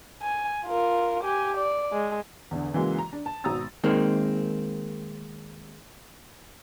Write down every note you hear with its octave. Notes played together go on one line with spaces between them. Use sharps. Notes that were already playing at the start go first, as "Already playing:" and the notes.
G#5
F4 A#4
G4 G#5
D5
G#3
E2 D3
C#3 E3 F#3 G#3 A#3
A#5
D4
A5
G#1 B2 A#5 D#6 E6 A6
D#3 G#3 A#3 C4